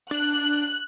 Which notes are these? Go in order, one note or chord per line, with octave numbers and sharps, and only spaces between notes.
D4 F#6